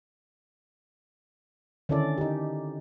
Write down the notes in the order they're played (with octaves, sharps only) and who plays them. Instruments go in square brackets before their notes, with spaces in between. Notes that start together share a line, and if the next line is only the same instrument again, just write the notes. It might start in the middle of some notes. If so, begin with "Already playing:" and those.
[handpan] D3 D#3 C#4 E4 A4 D5
D#4 G4